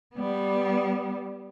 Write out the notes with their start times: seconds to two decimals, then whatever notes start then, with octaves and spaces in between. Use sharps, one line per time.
0.15 G3 B3